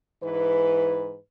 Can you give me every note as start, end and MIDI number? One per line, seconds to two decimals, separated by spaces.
0.22 1.15 44
0.22 1.15 52
0.22 1.15 71